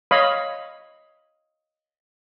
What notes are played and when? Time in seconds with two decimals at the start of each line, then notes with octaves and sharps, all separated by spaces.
0.11 C#5 D#5 F5 B5